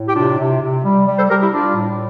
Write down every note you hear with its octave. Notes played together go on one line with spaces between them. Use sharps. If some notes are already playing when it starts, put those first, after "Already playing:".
Already playing: A2
G4
C3 D4 F4
C3
C3
G3
G3
A4 C5
G3 G4 A#4
E4 G4
G3 D4 F4
A2